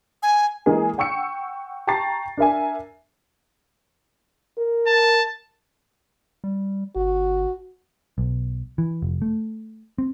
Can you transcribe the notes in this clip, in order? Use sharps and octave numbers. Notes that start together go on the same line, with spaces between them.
G#5
E3 G#3 A#3 G#4
F#5 G5 C#6 E6 C#7
G5 A5 A#5 C#6 A6 C7
D4 A#4 E5 G#5
A#4
A5
G3
G1 F#4
B1
E3
F1
A3
C4